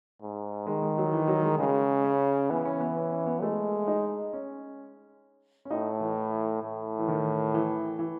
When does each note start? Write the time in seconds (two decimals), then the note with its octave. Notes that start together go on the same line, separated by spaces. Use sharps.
0.22 G#2
0.67 D#3 G#3
0.82 G#3
0.98 F#3
1.13 E3
1.28 F#3
1.43 G#3
1.59 C#3 G#3
2.04 C#4
2.50 E3 B3
2.65 C#4
2.80 B3
2.96 C#4
3.11 C#4
3.26 B3
3.42 G#3 A3
3.87 D#4
4.33 C#4
5.65 C#4
5.71 A2 D#4
6.01 E3
6.62 A2
6.99 E3
7.08 D#3
7.54 E3
7.99 E3